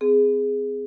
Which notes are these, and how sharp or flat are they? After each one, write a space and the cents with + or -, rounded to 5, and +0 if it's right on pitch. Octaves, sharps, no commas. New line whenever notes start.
C4 -35 G#4 +0